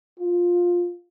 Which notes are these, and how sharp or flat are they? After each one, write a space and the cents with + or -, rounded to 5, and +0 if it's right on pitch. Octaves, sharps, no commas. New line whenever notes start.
F4 +10